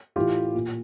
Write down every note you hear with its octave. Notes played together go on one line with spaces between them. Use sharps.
A2 E3 F4 G4
A#2